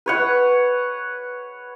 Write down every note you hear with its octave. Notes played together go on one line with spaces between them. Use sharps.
B4 C#5 F#5